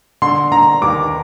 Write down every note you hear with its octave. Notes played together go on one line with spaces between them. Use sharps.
D3 C6
D3 A#5
D#2 D6